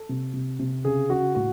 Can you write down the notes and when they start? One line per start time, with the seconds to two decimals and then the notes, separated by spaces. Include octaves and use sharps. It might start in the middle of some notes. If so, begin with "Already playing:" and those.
Already playing: A4
0.09 C3
0.34 C3
0.59 C3
0.85 C#3 G#4
1.10 C#3 F#4
1.35 A2 F#4